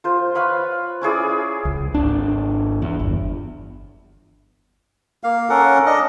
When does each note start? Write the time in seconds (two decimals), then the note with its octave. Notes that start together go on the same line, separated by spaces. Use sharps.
0.04 F4 C5
0.35 B4 C#5 F5 B5
1.01 C#4 E4 G#4 D5
1.65 C#2
1.94 G#1 D4
2.82 E2
3.00 G1
5.24 A#3 F5
5.49 C#4 A4 A#4 F#5
5.86 D4 D#5